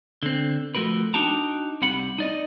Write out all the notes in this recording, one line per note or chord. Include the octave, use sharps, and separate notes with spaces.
D3 C4
F3 A3 F#4 A#4 B4
D4 D#4 F#4 G5 A5 A#5
C2 C3 F#5 B5
D#4 D5 D#5